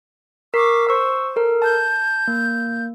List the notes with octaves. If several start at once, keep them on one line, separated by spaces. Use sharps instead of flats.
A#4 C#6 D6 E6 B6 C7
C5 C#6 E6
A4 A#4
A5 G6
A#3